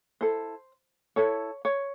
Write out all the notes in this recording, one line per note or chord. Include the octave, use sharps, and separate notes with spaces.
E4 A4 C5
E4 A4 C#5
C#5